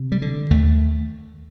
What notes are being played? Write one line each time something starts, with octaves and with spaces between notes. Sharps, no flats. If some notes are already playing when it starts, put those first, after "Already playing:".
Already playing: C3
G3
D3
D#2 A3